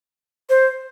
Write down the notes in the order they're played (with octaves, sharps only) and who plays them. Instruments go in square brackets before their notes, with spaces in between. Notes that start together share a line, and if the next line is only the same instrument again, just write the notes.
[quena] C5